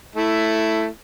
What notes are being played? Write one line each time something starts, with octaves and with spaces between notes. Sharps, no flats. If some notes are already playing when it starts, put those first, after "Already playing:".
A3 E4